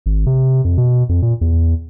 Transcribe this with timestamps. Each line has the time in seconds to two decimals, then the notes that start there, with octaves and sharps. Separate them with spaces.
0.06 G#1
0.26 C3
0.65 F2
0.78 B2
1.09 F2
1.22 A#2
1.41 E2